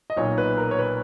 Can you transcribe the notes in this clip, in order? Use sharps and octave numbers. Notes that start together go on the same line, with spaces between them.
D#5
B1 A#2 C#5
B4
A#4
C#5
B4